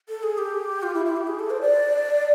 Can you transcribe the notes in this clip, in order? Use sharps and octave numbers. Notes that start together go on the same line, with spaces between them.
A4
G#4
G4
F4
E4
E4
G4
G#4
A4
C5
D5